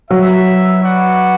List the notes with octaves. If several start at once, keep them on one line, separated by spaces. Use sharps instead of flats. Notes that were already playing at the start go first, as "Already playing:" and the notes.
F#3 E4 B4 E5
F#4 B4 D5 F#5